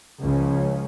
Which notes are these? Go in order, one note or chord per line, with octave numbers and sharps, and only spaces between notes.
C#2 C#3 F3 C#4